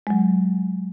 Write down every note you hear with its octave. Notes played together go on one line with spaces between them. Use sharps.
F#3 G#3